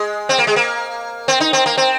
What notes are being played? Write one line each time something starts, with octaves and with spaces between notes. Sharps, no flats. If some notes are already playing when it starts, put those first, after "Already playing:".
Already playing: G#3
C4
A#3
G#3
A#3
C4
D#4
C4
A#3
C4